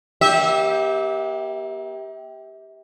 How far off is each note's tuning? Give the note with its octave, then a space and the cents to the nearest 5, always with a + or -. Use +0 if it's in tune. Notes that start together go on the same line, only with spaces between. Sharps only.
A#3 +40 G4 +0 E5 -35